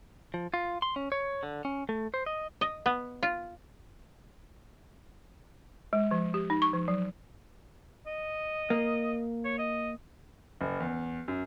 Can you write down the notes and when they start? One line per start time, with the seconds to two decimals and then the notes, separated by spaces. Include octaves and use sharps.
0.34 F3
0.54 F4
0.82 C6
0.96 C#4
1.12 C#5
1.43 D3
1.65 C#4
1.89 A3
2.14 C5
2.26 D#5
2.61 D#5
2.86 B3
3.23 F4
5.93 G#3
6.11 F3
6.34 G4
6.50 D#4
6.62 C#6
6.73 F3
6.88 F#3
8.07 D#5
8.70 A#3
9.45 C#5
9.58 D#5
10.61 F#1
10.80 E2
11.28 F#2